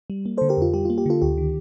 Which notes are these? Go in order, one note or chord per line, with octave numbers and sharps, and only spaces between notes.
G3
A#3
D3 A4 C5
G4 A#4
F2 F4
G3 G4
A#3 F4
G4
D3 F4 A4
D2 G4
D#3